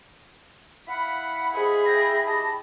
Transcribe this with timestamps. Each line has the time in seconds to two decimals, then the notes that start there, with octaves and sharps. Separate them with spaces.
0.88 E4 F5 F#5 B5
1.53 G#4 C5 D#5
1.86 E5 G5 A#6
2.25 G4 D#5 A5 A#6